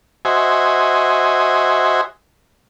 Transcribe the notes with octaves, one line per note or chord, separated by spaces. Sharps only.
F#4 C5 D#5 E5 G#5